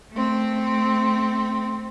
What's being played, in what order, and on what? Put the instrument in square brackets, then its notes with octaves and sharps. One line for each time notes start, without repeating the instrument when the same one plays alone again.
[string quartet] A3 C4